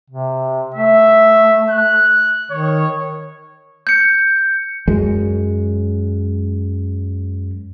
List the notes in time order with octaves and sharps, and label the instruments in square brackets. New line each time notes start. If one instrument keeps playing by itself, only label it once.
[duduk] C3
[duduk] A3 [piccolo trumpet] E5
[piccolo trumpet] F#6
[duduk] D#3 [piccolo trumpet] C#5
[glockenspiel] G6 C#7
[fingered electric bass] F#2 G#3